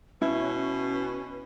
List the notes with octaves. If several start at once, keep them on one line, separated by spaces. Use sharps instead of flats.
B2 C#4 E4 B4